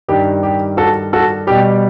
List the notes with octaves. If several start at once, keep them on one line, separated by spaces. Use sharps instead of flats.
G2 D#3 G3 G4
G4
F#4 A4
F#4 A4
B2 G3 G4